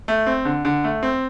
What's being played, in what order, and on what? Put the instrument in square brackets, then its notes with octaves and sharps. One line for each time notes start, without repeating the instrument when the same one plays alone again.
[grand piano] A3
C4
D3
D3
A3
C4